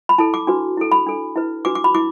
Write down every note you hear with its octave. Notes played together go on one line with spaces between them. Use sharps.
B5
E4 A4 A5
D6
D4 F#4 B4
E4 A4
B5
D4 A4
E4 B4
D4 F#4 B4 D6
D6
B5
E4 D6